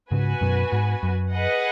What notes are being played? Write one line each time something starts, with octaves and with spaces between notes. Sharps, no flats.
G#2 C#3 B3 F#4 B4 G#5
F#2 B2
G#2
F#2
G#4 B4 D#5 F#5